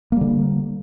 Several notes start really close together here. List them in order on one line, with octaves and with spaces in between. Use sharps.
A#3 G3 D3